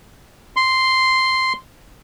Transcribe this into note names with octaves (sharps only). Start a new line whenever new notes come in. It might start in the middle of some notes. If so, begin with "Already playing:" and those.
C6